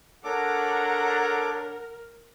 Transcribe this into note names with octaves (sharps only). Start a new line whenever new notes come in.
D4 A4 A#4 C#5 F#5 A#5 D6